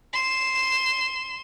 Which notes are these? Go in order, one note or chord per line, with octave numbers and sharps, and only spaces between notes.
C6 E7